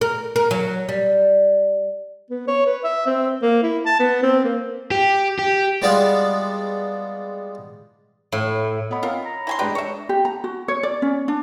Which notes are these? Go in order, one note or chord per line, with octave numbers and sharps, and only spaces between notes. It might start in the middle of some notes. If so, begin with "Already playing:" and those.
A#4
A#4
F#3
G3
B3
C#5
B4
E5
C4
A#3
E4
A5
B3
C4
A#3
G4
G4
G3 G#3 B3 D4 F4 D5
A2
B3 C#5 D#5 B5
C4 F4 A#4
A#5
E4 G#5 C6
G#3 D4 G4 B4 G5
D4 C#5 E5
G4
A#5
F#4
C#5
D5
C#4
D4